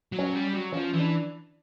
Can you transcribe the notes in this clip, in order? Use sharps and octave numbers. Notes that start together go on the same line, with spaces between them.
F#3
C#4
G3
F#3
F3 C#4
E3
D4